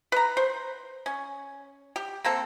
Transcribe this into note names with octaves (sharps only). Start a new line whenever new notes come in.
B4 A#5
C5
C#4
G4
A#3 C4 A4